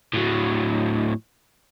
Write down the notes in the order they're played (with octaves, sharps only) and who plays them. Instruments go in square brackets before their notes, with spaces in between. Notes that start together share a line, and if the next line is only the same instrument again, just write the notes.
[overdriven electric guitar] A2 F#3